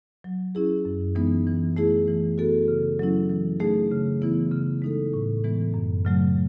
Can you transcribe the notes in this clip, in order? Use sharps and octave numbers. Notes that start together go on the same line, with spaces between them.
F#3
C#4 E4 G#4
F#2
E3 G#3 B3 D#4
E3
A3 E4 G#4
E3
B3 F#4 A4
C#3
F#3 C#4 E4
E3
A3 D#4 G#4
C#3
E3 B3 E4
C#3
G#3 D#4 A4
A2
E3 G#3 B3
F#2
C#3 F#3 A3